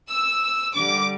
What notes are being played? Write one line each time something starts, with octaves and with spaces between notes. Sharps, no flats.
E6
D3 G3 D6